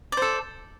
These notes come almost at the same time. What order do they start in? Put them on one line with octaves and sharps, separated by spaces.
D5 C5 A4